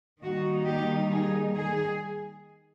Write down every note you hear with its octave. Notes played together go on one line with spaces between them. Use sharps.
D#3 G3 A#3 D#4 F#4
G4
G#4
G#4